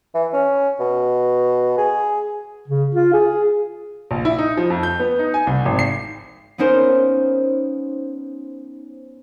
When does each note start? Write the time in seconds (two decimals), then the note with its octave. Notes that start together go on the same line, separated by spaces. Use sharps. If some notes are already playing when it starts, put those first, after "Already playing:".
0.14 E3
0.33 C#4
0.80 B2
1.78 G#4
2.68 C#3
2.95 F4
3.14 G#4
4.11 A#1
4.25 E4
4.39 D#4
4.57 F3
4.70 F2
4.83 G6
5.00 B3
5.19 D#4
5.34 G#5
5.47 C2
5.65 G#1
5.79 C7
6.58 B3 C#4 D#4 A#4 C5